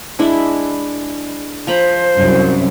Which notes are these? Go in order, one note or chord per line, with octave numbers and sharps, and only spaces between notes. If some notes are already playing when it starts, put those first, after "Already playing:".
G#3 D4 E4
F3 C5 A#5 B5
C2 F#2